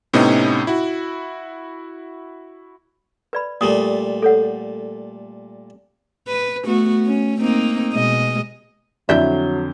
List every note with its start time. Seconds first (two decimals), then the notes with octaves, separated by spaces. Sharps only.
0.13 A2 C3 B3 C#4 D#4
0.67 E4 F#4
3.33 B4 D5 B5
3.61 A#2 G3 A3 D#6
4.22 A4 C#5 F#5
6.28 B4
6.65 A3 B3 F#4
7.06 C#4
7.40 A#3 C4 D#4
7.93 B2 G#3 D#5
9.09 F2 D3 F#3 E4 D5 E5 G6